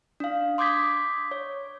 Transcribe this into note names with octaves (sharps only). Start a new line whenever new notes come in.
D4 F5
C6 D6 D#6 G6 G#6 B6
C#5